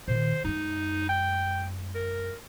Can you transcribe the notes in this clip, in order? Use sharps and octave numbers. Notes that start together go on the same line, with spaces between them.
A#2 D#3 C5
F#2 G#3 D#4
G5
A#4